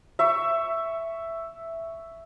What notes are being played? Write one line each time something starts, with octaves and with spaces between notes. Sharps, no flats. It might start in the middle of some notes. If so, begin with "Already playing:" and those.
E5 C#6